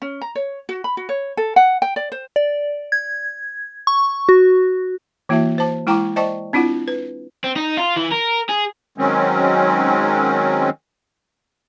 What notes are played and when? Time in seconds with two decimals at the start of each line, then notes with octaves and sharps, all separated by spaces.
0.02 C#4
0.21 A#5
0.35 C#5
0.69 F#4
0.84 B5
0.97 F#4
1.09 C#5
1.37 A4
1.56 F#5
1.82 G5
1.96 D5
2.12 C5
2.36 D5
2.92 G#6
3.87 C#6
4.29 F#4
5.29 E3 A#3 E4 F#4 E5 A5
5.58 C5 A5
5.87 G#3 E4 G5 A#5 C#6 D6
6.16 C5 D5 D#5 G5 A5 C#6
6.53 C4 D4 E4 F4 F#5
6.88 B4
7.44 C4
7.56 D#4
7.77 F4
7.96 E3
8.11 A#4
8.49 G#4
8.98 D#3 F#3 G#3 C4 C#4